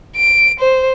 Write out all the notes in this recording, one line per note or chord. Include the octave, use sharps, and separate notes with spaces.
D7
C5